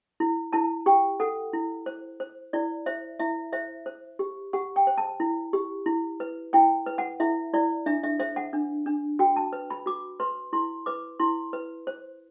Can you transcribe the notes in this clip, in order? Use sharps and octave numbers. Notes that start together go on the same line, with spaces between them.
E4
E4 A5
G4 G5
A4 F#5
E4
C5
C5
E4 D5
C5 E5
E4 E5
C5 E5
C5
G4
G4 F#5
G5
C5
A5
E4
G4
E4
B4
E4 G5
B4
F#5
E4 E5
E4 D5
D4 E5
E5
C5 E5
F#5
D4
D4
F#4 G5
A5
B4
B5
F#4 D6
B4 C6
E4 C6
B4 D6
E4 C6
B4
C5